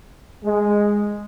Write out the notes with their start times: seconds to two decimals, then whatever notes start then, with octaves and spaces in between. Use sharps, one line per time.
0.43 G#3